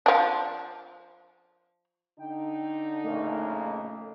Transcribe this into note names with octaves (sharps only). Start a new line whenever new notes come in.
F3 D4
D3 D#4 G5
A#1 C#3 A3 A#3 D#5